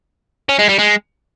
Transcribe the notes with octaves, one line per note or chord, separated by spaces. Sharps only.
C#4
G#3
G3
G#3